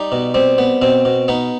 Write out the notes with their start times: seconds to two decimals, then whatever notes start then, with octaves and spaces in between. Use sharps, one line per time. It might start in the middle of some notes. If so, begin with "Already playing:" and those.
Already playing: G3 D#4
0.12 B2
0.34 G3 C4
0.58 B3
0.82 B2 C4
1.05 B2
1.28 B3 D#4